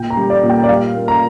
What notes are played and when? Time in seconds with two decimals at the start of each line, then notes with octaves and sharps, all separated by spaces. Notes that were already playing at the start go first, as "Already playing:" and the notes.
Already playing: A#2 G5
0.10 A#5
0.17 G3
0.30 D5
0.43 A#2
0.49 G5
0.63 D5
0.69 G3 F5
0.95 A#3
1.08 A#5